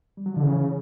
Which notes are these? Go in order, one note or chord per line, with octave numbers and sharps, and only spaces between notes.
G3
F#3
D3 F3
C#3 E3